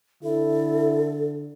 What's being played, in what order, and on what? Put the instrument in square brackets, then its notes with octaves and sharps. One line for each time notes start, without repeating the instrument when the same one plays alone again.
[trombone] D3 [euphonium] E4 [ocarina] A4